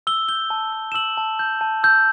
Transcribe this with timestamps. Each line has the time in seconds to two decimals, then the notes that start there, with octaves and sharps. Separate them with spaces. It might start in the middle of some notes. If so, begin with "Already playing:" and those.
0.07 E6 G7
0.29 G6 G7
0.50 A5
0.72 E6
0.92 E7
0.95 E6 F#7
1.18 A5
1.39 G6
1.61 A5
1.83 E6 G6